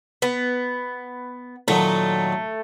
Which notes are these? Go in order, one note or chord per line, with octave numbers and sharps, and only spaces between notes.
B3
A#2 D#3 F#3 A3